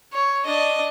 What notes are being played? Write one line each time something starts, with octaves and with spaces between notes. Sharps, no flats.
C#5
D4 D#5